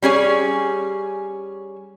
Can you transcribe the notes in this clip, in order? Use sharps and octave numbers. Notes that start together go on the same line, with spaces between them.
G3 C#4 G#4 C#5